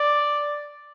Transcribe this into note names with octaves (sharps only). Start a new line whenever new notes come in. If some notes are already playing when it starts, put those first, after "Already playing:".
Already playing: D5